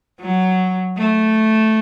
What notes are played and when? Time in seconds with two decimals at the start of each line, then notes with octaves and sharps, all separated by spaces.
0.21 F#3
0.97 A3